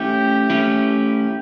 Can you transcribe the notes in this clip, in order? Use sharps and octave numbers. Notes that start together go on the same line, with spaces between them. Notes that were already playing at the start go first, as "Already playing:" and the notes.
Already playing: A3 C#4 E4 G4
A3 C#4 E4